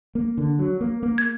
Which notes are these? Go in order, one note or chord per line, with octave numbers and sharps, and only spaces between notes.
A#3
D3
F#3
A#3
A#3
G#6